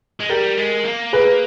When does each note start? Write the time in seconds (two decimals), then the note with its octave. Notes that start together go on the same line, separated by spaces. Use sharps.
0.20 G#3
0.29 G3 G4 A#4
0.57 G#3
0.85 A#3
1.13 G#4 B4